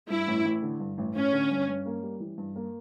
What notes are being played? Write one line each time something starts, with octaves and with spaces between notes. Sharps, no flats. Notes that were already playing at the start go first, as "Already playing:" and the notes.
G2 E4
A1
A1
D3
G2
A1
A1 C#4
D3
G2
G2
A#3
G3
E3
G2
A#3